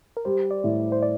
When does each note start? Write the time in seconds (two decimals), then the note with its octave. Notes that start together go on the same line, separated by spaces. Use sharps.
0.17 A#4
0.25 G3 C5
0.51 D5
0.64 A2
0.92 C5
1.02 D5